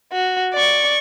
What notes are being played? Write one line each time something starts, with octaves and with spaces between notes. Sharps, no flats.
F#4
D5 C#6